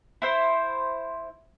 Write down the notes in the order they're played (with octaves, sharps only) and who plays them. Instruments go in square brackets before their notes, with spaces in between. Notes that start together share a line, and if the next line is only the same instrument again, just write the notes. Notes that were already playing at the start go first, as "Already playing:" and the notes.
[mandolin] E4 C5